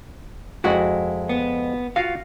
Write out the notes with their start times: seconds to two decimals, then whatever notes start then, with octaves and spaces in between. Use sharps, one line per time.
0.64 F2 G#3 E4 F#4 F#5
1.29 B3
1.96 F4 F#4 F5